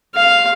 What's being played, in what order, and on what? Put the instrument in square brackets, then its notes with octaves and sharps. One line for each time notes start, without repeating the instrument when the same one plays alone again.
[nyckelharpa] F5